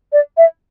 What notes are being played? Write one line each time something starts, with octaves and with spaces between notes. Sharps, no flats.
D5
E5